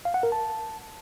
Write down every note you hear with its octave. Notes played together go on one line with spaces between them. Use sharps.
F5
F#5
A#4
A5